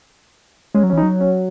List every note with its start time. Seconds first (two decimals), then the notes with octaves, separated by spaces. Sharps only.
0.74 G#3 C#4
0.83 F#3
0.90 C#4
0.93 E3
0.98 D#4
1.03 F#3
1.20 C#4